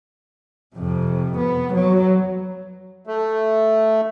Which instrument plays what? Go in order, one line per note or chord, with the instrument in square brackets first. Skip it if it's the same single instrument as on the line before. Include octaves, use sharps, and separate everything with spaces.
[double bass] F2 C3
B3
F#3
[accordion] A3